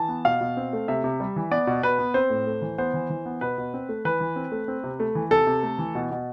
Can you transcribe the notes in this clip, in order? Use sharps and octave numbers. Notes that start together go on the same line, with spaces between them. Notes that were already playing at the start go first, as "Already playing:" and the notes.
Already playing: E3 A5
B3
B2 F5
B2
C4
A3
C3 E5
C3
G3
E3
B3 D5
B2
B2 B4
B3
C4 C5
A2
A3
E3
B3 C5
E3
E3
B3
B2 B4
B2
C4
A3
E3 B4
E3
C4
A3
C4
C3
A3
E3
C3 A4
C3
A3
E3
B2
B2